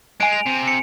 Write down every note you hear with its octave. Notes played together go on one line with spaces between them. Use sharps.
G#3 G#5 D7
F7
C3
C#7